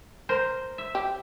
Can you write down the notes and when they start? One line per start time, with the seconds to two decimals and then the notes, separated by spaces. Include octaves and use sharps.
0.29 A#4 C5
0.78 E5
0.95 G4